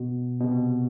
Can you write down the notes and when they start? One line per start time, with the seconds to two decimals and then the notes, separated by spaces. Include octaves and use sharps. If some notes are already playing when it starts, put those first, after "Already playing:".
Already playing: B2
0.41 B2
0.44 C3